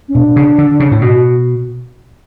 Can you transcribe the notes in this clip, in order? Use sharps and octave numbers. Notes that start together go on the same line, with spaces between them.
C#4
B2 D4
C#3
D3
C#3
A2
B2 F#4